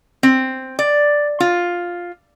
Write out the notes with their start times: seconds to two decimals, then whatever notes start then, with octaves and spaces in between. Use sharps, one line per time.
0.23 C4
0.79 D5
1.40 F4